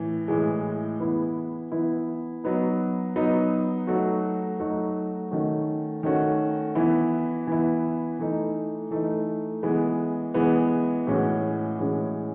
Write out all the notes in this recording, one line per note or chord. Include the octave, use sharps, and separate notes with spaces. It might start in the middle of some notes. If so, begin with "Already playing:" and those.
Already playing: A2 E3
A2 E3 G#3
E3 B3 E4
E3 B3 E4
F#3 B3 D#4
F#3 B3 D#4
F#3 A3 D#4 F#4
F#3 A3 D#4 F#4
D#3 A3 C#4 F#4
D#3 A3 C#4 F#4
E3 B3 E4
E3 B3 E4
E3 A3 D#4
E3 A3 D#4
E3 G#3 B3
E3 G#3 B3
A2 E3 G#3 C#4 F#4
A2 E3 G#3 C#4 F#4